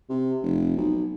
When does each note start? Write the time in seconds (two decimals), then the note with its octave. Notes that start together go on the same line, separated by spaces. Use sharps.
0.09 C3
0.43 F1
0.77 B1